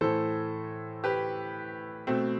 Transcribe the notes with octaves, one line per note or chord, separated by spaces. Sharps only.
A2 E3 A4 C5
G4 B4
B2 A3 C4